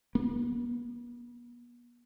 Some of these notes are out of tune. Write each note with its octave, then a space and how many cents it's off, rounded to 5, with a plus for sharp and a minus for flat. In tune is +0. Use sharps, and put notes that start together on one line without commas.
B3 -45